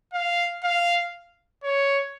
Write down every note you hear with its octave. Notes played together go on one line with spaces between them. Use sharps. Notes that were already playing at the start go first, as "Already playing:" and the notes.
F5
F5
C#5